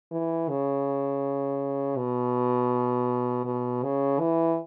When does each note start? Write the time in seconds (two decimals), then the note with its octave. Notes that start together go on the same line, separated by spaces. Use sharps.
0.12 E3
0.49 C#3
1.97 B2
3.45 B2
3.83 C#3
4.19 E3